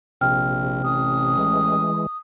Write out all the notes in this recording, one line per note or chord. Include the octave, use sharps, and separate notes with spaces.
A#1 C3 G5 F6
A1 D#6
E3 G#3